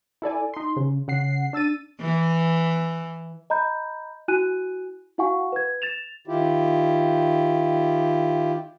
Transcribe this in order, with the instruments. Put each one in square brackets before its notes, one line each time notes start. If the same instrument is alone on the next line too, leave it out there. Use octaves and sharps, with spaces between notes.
[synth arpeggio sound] E4 A4 D5 G#5
D#4 C6
C#3
C#3 F#5 C7
D4 E6 A6 D#7
[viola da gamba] E3
[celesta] D#5 A#5 B5 G6
E4 F#4 G#5 F#6 D#7
E4 F#4 F5 F#5 G#5 C#6
B4 G#6
A6 E7 F7
[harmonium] D#3 E4 F4 G4